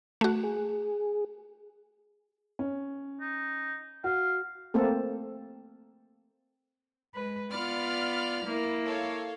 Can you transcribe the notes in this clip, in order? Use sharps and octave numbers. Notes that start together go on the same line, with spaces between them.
A3 F#4
G#4
C#4
D#4
F#4 F5
A3 A#3 C4 A4
G#3 B4
B3 F4 D5 B5 F6
A#3 E4
A4 C#5 F5